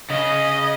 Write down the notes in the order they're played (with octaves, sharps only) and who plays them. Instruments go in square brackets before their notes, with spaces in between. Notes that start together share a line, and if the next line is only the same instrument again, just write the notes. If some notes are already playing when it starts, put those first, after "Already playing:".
[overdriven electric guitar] C#3 [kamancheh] D#5